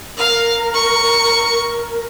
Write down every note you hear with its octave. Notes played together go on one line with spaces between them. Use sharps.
A#4 F5
C#6